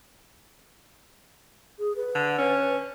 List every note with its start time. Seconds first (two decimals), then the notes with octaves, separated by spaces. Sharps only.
1.79 G#4
1.96 B4
2.15 D3
2.39 C#4